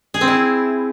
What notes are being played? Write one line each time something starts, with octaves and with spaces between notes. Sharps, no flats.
G#4
C4
E4